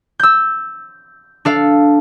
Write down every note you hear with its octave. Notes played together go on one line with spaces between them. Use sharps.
E6 G6
D4 A4 F5